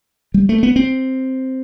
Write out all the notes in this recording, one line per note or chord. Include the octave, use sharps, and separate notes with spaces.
G3
A3
B3
C4